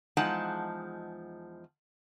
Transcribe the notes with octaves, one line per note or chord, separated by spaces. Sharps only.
E2 F3 G#3 D#4 F#5 A5